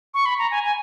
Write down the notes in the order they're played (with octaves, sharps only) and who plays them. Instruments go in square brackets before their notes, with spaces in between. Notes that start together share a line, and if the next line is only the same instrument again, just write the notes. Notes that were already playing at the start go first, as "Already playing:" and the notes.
[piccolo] C#6
B5
A#5
G#5
G#5